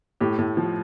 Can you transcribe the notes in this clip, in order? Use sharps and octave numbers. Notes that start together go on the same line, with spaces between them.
A2 G4
A2
F3